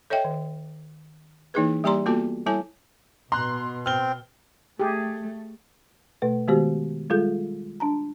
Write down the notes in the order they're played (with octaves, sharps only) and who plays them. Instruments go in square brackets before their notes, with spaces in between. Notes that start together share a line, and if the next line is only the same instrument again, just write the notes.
[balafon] A4 C#5 D#5 E5 G5
D#3
E3 A#3 D#4 E4 G#4 B4
G3 A#3 G4 D5 A#5 C6
A#3 B3 F4 F#4 A4 A5
G3 E4 A4 C#5 G#5 A5
[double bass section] B2 [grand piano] A#5 F#6 [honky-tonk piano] C6
[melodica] C4 [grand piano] F6 G7
[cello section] A3 [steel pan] G4 G#4
[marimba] B2 A3 B4
D#3 G#3 B3 F#4 G4 C5
G3 G#3 F4 G#4 A4 G6
D4 A5 A#5